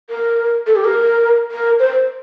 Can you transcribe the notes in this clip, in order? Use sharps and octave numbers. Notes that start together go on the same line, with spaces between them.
A#4
A4
G4
A#4
A#4
C5